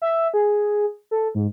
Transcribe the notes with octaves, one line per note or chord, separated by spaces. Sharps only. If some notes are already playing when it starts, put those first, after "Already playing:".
E5
G#4
A4
G#2